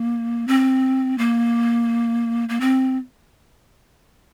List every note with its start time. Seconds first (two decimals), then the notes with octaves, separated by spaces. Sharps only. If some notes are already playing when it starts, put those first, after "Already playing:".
Already playing: A#3
0.48 C4
1.18 A#3
2.49 A#3
2.61 C4